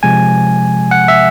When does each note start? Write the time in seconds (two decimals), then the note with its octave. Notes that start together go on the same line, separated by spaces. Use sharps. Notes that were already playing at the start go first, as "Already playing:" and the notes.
0.03 C3 F3 G#3 G#5
0.91 F#5
1.08 E5